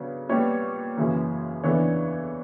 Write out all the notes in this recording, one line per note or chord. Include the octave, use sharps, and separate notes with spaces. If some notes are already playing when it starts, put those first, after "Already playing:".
Already playing: C#3 F#3 B3 D4 C#5
A#2 G3 B3 C#5
F#2 C#3 E3 A#3
E2 C#3 E3 B3 D4 C#5